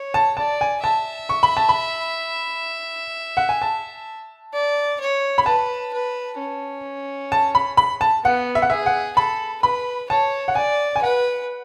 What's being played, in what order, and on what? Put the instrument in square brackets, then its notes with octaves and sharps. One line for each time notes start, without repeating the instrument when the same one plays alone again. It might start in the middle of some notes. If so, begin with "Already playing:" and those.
Already playing: [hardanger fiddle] C#5
[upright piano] A5
[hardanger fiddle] D5 [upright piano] A5
[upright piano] G#5
[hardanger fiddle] E5 [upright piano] A5
[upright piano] C#6
B5
A5
B5
F#5
G#5
A5
[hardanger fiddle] D5
C#5
[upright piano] B5
[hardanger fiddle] B4 [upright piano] A5
[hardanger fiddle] B4
C#4
[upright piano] A5
B5
B5
A5
[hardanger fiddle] B3 [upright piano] F#5
[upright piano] E5
F#5
[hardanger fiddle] G#4 [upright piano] E5
[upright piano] F#5
[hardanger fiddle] A4 [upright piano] B5
[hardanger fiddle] B4 [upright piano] B5
[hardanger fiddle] C#5 [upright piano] A5
[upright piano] F#5
[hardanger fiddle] D5 [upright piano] G#5
[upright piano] G#5
[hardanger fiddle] B4 [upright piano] F#5